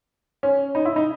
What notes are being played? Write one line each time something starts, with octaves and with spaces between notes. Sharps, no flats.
C#4
D#4
E4
D#4